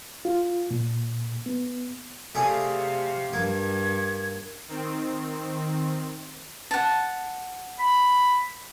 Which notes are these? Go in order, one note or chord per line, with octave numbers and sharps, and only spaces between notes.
F4
A#2
B3
C3 A3 G#4 D5 F5
G2 A#3 G#6
D#3 C4
F#5 A5
B5